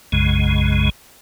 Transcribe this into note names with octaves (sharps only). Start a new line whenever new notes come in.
B1 F#2 C#3 G#3